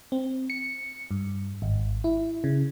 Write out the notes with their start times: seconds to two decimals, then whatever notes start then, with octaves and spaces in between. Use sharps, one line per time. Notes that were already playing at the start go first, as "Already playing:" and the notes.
0.12 C4
0.50 C#7
1.11 G2
1.62 G#1
2.04 E4
2.44 C#3